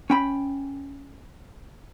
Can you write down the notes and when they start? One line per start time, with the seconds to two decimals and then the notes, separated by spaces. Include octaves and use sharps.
0.10 C#4 G5 B5